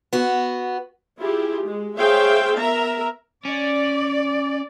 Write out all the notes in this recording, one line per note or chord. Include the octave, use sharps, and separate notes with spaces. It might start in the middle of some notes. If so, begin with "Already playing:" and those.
B3 F#4
E4 F4 G4 G#4
G#3
G#4 C5 C#5 E5 F5 G5
B3 A#4 E5 A#5
C#4 D5